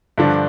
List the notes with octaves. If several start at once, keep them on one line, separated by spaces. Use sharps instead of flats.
G2 D3 F3 D4